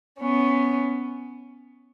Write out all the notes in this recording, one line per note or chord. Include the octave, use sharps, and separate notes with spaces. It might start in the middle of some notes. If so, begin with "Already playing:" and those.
B3 C#4